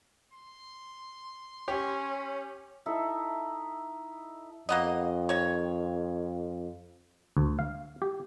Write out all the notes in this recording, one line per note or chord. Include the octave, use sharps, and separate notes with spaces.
C6
C#4 G4 C#5
D#4 E4 A4 E5
F2 A#3 B3 D#5
D#3 C#5
D2
F5
G4